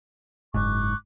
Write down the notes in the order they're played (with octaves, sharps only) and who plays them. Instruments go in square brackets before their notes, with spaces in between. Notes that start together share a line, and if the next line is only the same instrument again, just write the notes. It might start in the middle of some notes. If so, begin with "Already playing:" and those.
[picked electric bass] F#1 G#2 [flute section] C#6 D6 F#6